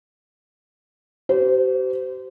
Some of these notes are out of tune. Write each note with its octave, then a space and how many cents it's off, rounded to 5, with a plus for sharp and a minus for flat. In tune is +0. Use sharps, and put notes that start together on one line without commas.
G4 -40 C5 -30